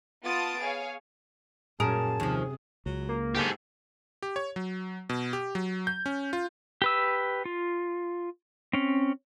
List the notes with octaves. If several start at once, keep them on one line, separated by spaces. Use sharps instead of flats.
B3 F4 A5 D#6 A6 D7
G#4 C#5 F5
F#2 A#2 G#4 A#4 A5
D#2 C3 F3
C#2 F#3
A#3
G#2 G4 A4
G4
C#5
F#3
B2
G4
F#3
G6
C#4
F4
G4 B4 E6
F4
C4 C#4